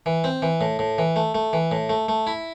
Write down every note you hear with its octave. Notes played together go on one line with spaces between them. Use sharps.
E3
C4
E3
A2
A2
E3
A3
A3
E3
A2
A3
A3
E4